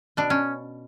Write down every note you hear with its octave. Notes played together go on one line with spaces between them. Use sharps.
B2 D4
C#4